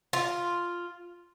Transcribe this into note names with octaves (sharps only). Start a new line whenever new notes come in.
F4